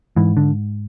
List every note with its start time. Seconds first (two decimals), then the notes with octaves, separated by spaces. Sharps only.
0.16 G#2 E3
0.37 D3